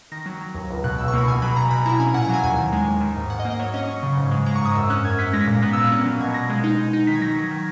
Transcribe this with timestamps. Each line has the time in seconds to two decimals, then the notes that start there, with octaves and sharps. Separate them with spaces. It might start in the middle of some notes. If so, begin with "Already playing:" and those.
0.12 D#3 A#6
0.26 F#3
0.41 F#3
0.55 D#2
0.69 C#2
0.84 B2 F#6
0.98 C#2 E6
1.08 C#6
1.13 A#3 B5
1.27 B2 G#5
1.42 F#3 B5
1.56 B2 A#5
1.71 B2 B5
1.86 E4 A#5
2.00 C#4 G#5
2.14 A#2 F#5
2.25 A#5
2.29 F#3 G#5
2.43 D#2 G#5
2.58 D#3
2.73 G#3
2.87 D#2
3.01 D#3
3.16 G#2
3.30 G#2 F#5
3.40 D#5
3.45 A#3
3.50 D#5
3.60 F#3 C#5
3.74 C#4 D#5
3.84 D#6
3.88 C#4 C#6
4.03 C#3
4.17 G#2
4.31 G#3
4.46 G#3 A#5
4.56 C#6
4.61 G#2 D#6
4.75 F#2 E6
4.90 C#4 F#6
5.05 F#2 G#6
5.19 C#4 B6
5.33 G#3 A#6
5.41 B6
5.48 A#2 A#6
5.62 B3 F#6
5.73 A#2 E6
5.85 F#6
5.92 C#4
6.06 F#3
6.20 B2 G#6
6.34 B2 A#6
6.50 G#3
6.64 D#4
6.79 D#4
6.93 D#4
7.07 D#3 B6
7.15 G#6
7.21 F#3 A#6
7.37 F#3
7.51 D#3